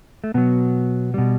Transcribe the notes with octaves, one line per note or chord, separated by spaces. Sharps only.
A3
B2 F#3 B3
B2 G3